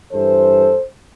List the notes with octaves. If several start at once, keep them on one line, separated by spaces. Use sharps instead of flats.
G2 E3 A4 C5